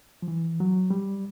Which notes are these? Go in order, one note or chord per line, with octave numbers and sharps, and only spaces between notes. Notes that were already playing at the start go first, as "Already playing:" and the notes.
F3
E3
F#3
G3